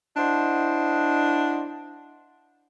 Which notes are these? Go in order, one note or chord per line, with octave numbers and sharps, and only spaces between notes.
D4 E4 C5 D#5 F#5